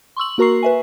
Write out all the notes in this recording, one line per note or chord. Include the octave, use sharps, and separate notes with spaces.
C6 C#6 E6 F#7
A#3 F#4 A#4 A#5 C#6 C7
B4 E5 G#5